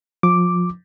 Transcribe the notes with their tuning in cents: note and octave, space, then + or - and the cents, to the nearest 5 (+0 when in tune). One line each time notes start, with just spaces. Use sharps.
F3 +25 D6 +0